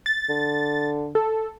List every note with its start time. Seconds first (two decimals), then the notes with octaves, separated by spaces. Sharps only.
0.06 A6
0.29 D3
1.15 A4